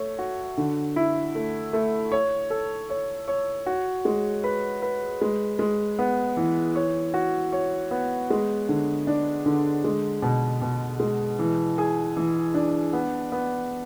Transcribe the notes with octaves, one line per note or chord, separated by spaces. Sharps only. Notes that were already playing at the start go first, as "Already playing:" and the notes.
Already playing: A3 C#5
F#4
D3
E4
A3
A3
C#5
A4
C#5
C#5
F#4
G#3
B4
B4
G#3
G#3
B3
E3
C#5
F#4
C#5
B3
G#3
D3
D4
D3
G#3
B2
B2
G#3
E3
G#4
E3
D4
B3
B3